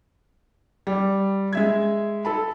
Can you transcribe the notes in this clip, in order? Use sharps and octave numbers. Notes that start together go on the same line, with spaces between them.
G3
G#3 E5 G#6
A4 A5 B5